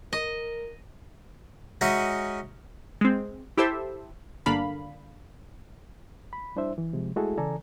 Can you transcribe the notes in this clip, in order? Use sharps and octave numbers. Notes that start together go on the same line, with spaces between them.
A#4 D#5
G#3 C#4 D#4 F#4 E5 F#5
G#3 C4
E4 G4 A4 C5 E5
G1 D3 A#3 D4 F5 B5
B5
G3 D4 E4 C5 E5
E3
C3 F3 G#3
G#3 A3 E4 F#4 G#4 A4
C#3 E3 A4 D5 G#5 A#5